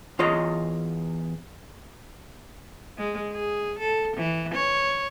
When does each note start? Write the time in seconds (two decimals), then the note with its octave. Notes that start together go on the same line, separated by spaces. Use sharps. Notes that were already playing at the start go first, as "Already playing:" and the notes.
0.19 E2 F4 C#5 D#5
2.98 G#3
3.33 G#4
3.79 A4
4.17 E3
4.55 C#5